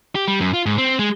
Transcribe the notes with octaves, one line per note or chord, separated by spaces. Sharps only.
G4
G3
F#2
F4
G#2
C4
G#3